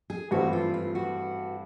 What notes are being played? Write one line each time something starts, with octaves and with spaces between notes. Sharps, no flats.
G#4
G2 E3 A3 C4 F#4
F4
F4
F#4